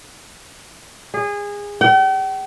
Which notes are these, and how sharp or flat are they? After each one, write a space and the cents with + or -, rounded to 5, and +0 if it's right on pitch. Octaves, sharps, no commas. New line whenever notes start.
G#4 -25
G5 -45